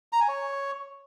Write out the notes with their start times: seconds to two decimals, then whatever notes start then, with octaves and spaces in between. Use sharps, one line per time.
0.13 A#5
0.20 G#5
0.28 C#5